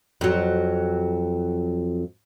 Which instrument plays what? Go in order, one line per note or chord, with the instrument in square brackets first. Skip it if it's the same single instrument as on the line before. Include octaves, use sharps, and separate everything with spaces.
[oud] F2 F#3